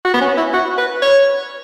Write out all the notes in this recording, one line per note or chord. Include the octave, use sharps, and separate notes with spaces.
F#4
B3
C#4
E4
F#4
B4
C#5